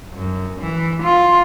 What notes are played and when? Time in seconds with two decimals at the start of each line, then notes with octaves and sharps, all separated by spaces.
0.15 F#2
0.61 E3
1.02 F4